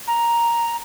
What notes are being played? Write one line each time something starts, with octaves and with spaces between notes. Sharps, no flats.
A#5